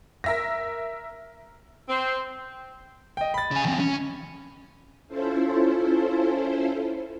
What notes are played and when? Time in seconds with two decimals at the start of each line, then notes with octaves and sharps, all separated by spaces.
0.24 A#4 E5 A#6
1.89 C4
3.17 D#5 G5
3.34 B5 A6
3.52 C#3 G#5
3.66 E2 C4
3.80 C#4
5.08 C#4 E4 F4 A4 C5